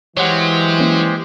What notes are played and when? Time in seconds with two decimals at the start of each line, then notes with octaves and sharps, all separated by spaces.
0.17 E3 F#3 G#3 G4 C5 C#5 F#5
0.80 A#3 C#4